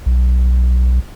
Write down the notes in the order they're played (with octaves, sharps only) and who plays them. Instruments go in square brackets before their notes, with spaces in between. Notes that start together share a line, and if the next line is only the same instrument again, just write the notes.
[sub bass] B1